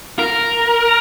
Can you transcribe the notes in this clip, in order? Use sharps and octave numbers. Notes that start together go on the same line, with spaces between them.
A#4